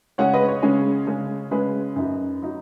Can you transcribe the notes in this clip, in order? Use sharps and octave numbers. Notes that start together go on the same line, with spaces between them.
C#3 G#3 C#4 C#5 F#5
B4 D#5
C#5
C#3 G#3 C#4
C#3 G#3 C#4
C#3 G#3 C#4 B4
F#2 F#3 D#4
F#3 D#4